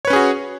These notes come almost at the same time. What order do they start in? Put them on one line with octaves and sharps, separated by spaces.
C#5 B4 C#4 G#4 F#4